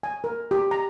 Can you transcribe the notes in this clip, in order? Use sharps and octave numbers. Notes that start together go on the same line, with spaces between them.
G#5
A#4
G4
A#5